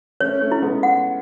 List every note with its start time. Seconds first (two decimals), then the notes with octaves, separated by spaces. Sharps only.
0.21 A3 C#4 C#5
0.41 A3 C#4
0.52 E4
0.62 G#3 B3
0.83 F#5